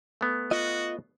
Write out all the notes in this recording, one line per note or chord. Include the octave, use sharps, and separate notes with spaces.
A3 B3
F4 F#4 D#5